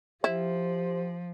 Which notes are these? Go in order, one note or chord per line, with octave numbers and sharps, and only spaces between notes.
F3 E4 G4 C5